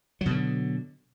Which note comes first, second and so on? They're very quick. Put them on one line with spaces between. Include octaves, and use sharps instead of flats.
F#3 B2 D3